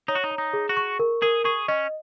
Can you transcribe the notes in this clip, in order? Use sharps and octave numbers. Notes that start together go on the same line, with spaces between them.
D#4 C#5
F#4
D#4
A#5
D#4
G#4
F#4
C#6
A#4
G#4 A#4
G#4 C#6
C#4 D#5